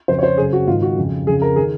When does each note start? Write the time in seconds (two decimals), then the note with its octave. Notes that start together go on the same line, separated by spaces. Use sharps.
0.08 F2 C#3 C5
0.19 C#5
0.23 C5
0.37 F#2 C#3 G#4
0.53 F#4
0.67 G#2 D#3 F4
0.82 F#4
0.97 F2 C#3
1.27 F2 C#3 G#4
1.42 A#4
1.56 D#3 G#4